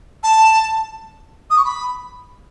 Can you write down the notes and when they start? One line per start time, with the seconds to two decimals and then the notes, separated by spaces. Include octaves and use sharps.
0.23 A5
1.50 D#6
1.58 C#6
1.65 B5